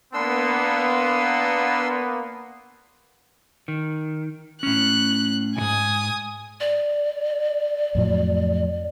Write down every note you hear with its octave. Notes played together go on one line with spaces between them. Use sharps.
A#3 B3 D4 C6 E6
D#3
A2 C#4 F#6
B1 G#2 G#5 D#6
D5
F2 A2 F#3